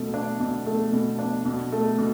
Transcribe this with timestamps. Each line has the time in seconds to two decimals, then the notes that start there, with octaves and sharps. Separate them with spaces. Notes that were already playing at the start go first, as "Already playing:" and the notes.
Already playing: B2 A3
0.14 D4
0.40 B2
0.67 A3
0.93 B2
1.19 D4
1.45 B2
1.72 A3
1.98 B2